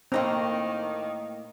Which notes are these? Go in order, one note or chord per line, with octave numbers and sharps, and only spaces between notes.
A2 D#3 A#3 C4 D#4 A#5